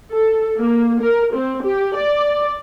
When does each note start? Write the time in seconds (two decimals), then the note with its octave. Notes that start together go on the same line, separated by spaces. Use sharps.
0.12 A4
0.59 A#3
1.02 A#4
1.35 C4
1.65 G4
1.97 D5